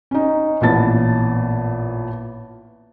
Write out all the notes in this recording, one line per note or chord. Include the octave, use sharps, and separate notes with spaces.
C#4 D#4
A1 A#2 B3 A5 A6